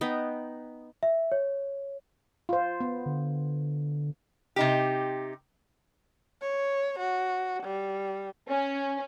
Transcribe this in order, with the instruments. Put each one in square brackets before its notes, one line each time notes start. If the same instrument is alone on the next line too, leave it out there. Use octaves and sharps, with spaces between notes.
[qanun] B3 D#4 D#5 G5
[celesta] E5
C#5
[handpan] F4 C5
B3
[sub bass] D3
[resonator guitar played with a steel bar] C3 D#4 G4
[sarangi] C#5
F#4
G3
[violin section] C#4